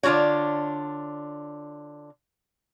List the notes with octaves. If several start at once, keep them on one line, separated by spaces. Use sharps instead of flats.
D3 D4 F4 F#4 C#5